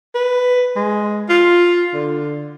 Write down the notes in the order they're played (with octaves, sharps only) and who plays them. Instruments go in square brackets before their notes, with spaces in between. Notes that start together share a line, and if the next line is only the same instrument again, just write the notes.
[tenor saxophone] B4
G#3
F4
D3